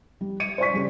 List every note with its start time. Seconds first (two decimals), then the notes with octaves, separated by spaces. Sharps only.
0.21 G3
0.40 C#7 D#7
0.58 C5 D5 C#6 B6
0.74 C#3 G3